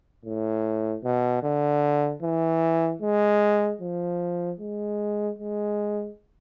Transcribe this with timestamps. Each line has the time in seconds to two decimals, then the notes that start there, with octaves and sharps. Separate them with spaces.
0.25 A2
1.04 B2
1.43 D3
2.22 E3
3.02 G#3
3.81 F3
4.60 G#3
5.39 G#3